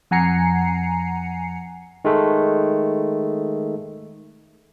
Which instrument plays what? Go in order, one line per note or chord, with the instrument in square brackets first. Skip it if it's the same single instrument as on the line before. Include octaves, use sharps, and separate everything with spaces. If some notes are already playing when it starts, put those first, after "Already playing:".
[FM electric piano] F2 F#5 G#5 A#5 C7 C#7
[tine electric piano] D#3 G#3 A3